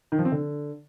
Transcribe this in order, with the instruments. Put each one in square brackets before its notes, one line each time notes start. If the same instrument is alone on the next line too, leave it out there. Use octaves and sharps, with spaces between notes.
[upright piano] D#3
F3
C4
D3